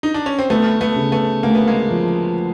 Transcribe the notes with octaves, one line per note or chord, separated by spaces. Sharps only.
D#4
D4
C#4
C4
D2 A3 B3
A3 B3
C#3
A3 B3
D2 A#3
B3
G#3 A#3
F3